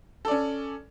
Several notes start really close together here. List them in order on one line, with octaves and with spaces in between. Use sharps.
A4 D5 C#4